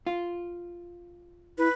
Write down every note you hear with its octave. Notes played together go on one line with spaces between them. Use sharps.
F4
E4 B4